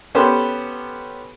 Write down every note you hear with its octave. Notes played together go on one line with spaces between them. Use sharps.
B3 C#4 G4 A4 B4 C5